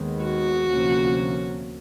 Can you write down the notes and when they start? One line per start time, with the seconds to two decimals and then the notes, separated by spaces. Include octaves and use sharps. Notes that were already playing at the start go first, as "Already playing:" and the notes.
Already playing: D#2 D#3 G#3 B3
0.24 F#4
0.68 D2 C3 F3 A#3 C#4